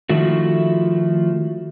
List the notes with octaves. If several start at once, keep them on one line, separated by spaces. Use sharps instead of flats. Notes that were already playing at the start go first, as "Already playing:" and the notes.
D#3 F3 A3 E4 F#4